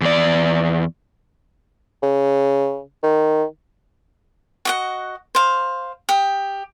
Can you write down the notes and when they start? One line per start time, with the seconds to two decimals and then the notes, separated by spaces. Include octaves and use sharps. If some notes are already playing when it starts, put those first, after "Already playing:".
0.01 E2 D5
2.03 C#3
3.03 D#3
4.65 F#4 D#5 F#5
5.35 C5 F5
6.09 G4 D#6